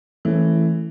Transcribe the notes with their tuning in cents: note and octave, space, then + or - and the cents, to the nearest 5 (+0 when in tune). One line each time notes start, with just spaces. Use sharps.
E3 +0 A3 +0 C#4 -40